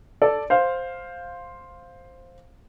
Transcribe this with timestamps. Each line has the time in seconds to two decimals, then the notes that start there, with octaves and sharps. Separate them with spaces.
0.22 A4 D5
0.50 C5 F5